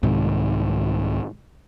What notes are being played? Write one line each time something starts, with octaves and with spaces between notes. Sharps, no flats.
C2 G#2 C3 D#3